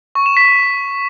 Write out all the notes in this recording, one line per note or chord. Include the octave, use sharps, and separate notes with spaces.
C#6
E7
B6